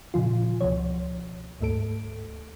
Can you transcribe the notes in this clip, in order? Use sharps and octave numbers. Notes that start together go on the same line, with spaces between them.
A#2 C#3 F3 F4
C#2 B2 F3 C#5
D2 G#2 A3 A4 D7